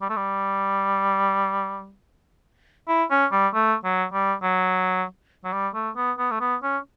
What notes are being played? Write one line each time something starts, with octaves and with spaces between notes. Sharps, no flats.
G3
A3
G3
E4
C#4
G3
A3
F#3
G3
F#3
F#3
G3
A3
B3
B3
A3
B3
C#4